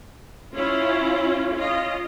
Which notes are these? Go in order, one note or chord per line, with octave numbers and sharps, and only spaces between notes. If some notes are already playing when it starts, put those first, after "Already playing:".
C#4 E4 F4
C#4 F4 D#5